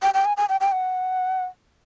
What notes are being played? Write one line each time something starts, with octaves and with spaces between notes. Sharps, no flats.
G5
G5
G#5
G#5
G5
G5
F#5